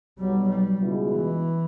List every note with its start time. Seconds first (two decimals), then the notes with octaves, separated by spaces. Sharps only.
0.19 B1 B2 F#3 G3
0.49 G3
0.80 C#2 B2 G#3 B3 E4
1.10 E3